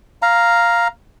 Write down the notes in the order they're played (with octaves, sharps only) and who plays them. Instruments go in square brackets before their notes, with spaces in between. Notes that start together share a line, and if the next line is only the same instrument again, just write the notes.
[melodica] F5 A#5